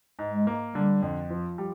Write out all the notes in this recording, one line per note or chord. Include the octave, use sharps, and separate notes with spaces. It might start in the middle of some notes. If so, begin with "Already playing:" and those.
G#2
G#3
A#3
D3 G3
F2
F3
G3